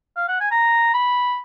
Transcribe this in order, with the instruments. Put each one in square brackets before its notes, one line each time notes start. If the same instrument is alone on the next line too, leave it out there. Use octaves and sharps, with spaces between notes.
[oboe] F5
F#5
G#5
A#5
B5